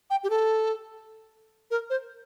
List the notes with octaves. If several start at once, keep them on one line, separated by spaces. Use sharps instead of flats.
G5
G4
A4
A#4
C5